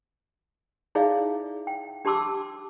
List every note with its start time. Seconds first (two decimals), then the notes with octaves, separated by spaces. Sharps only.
0.95 D#4 E4 G#4 D5 E5 F5
1.67 G5
2.05 D4 G4 A5 C6 D6 E6